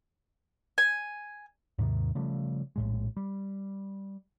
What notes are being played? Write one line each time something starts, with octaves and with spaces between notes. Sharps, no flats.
G#5
D#2 G#2 C3 D#3
C#3 F3 G3 A3
A#1 A2 G#3
G3